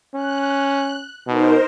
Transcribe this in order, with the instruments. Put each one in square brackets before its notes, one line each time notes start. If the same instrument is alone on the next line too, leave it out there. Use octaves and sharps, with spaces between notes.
[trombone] C#4 [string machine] F#6
[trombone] B2 [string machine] D#4 A#4 C5